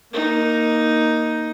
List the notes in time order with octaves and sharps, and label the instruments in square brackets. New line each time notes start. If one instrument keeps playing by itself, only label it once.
[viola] A#3 D#4